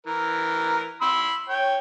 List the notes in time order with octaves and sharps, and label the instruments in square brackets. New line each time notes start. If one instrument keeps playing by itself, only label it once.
[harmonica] E3 A#4
B5 C6 E6
C#5 G5